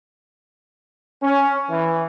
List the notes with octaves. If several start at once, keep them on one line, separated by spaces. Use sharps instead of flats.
C#4
E3